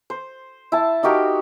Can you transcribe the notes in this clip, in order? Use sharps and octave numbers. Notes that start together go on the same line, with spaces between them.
C5
E4 A5
D#4 F#4 G4 A#4